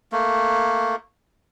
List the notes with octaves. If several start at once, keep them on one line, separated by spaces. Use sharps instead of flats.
A3 A#3